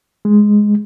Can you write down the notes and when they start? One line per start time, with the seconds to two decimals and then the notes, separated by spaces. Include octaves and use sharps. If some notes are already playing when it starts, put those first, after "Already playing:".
0.25 G#3